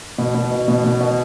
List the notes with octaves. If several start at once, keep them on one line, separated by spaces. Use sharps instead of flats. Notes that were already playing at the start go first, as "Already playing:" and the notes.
B2
B2
B2
B2
B2
B2